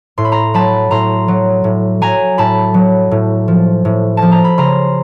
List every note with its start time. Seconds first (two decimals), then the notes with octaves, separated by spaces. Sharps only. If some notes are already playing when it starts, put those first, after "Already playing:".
0.18 A2 C6
0.25 B5
0.32 A#5 C6
0.54 F#3 A5 B5
0.91 A2 A#5 C6
1.28 F#3
1.64 A2
2.01 F#3 G#5 A#5
2.38 A2 A5 B5
2.74 F#3
3.11 A2
3.48 F3
3.85 A2
4.17 F3 A5
4.32 A#5
4.44 B5
4.58 C#3 A#5 C6